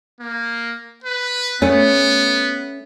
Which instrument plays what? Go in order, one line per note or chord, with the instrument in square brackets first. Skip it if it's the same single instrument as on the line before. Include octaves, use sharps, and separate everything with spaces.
[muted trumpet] A#3
B4
[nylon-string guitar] A3 C#4 [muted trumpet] B3